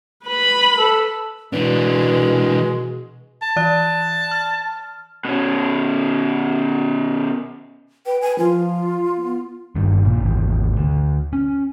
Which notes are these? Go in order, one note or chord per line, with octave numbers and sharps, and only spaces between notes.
B4 B5
A4
B2 E3 G#3 D4 B4
A5
E3 D5 F#6
F6
B2 C#4
B4 G5
G#5
F3 F4
B3
G1 G2 D#3
A#1 A#2
G#1 E2
D2
C#4